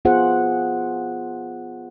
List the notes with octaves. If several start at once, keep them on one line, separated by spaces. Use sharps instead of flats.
B3 F4 G#4 C5 F#5